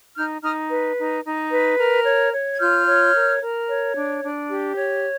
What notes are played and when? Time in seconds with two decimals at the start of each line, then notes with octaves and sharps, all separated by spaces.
0.16 D#4 F6 G6
0.43 D#4 D#6 F6
0.70 B4
0.97 D#4
1.24 D#4
1.52 B4
1.78 A#4
2.05 C#5
2.33 C#5
2.54 G#6
2.60 F4 F6 G6
2.87 C#5
3.14 A#4
3.41 A#4
3.69 C#5
3.96 D4
4.23 D4
4.49 G4
4.76 C#5